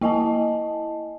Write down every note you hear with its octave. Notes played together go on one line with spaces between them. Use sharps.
A#3 E4 D#5 G#5 A5